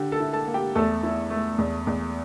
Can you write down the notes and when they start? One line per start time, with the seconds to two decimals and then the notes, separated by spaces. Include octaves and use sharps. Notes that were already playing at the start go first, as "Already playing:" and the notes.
Already playing: D3 G4 G5
0.12 A4 A5
0.20 E4
0.33 A4 A5
0.47 A#3
0.54 G4 G5
0.75 E2 A3 A4
1.03 E4
1.30 A3
1.58 E2
1.87 E2